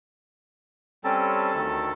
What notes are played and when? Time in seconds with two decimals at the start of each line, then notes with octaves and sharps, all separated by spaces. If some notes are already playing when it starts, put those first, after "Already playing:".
1.04 G3 C4 C#4 A4 A5
1.54 D2 D#3